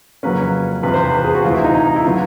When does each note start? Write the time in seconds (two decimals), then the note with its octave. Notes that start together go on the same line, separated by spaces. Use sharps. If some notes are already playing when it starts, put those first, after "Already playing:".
0.23 F2 C#3 F#3 A#3 C#4 B4
0.83 E2 C3 F3 B4
0.94 C5
1.04 B4
1.14 B4
1.24 G#4
1.35 F#4
1.44 D2 C3 E3 F4
1.54 E4
1.64 D#4
1.74 D#4
1.96 E4
2.05 D3 F#3 B3 F4